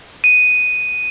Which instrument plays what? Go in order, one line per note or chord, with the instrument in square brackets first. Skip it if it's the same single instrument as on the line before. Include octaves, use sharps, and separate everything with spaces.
[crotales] D#7